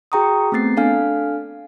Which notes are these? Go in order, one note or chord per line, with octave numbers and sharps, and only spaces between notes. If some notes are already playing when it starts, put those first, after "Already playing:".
F#4 G#4 G5 A#5 C#6 D#6
A3 B3 C4 A6 C7
D4 A4 F5 G#5 F6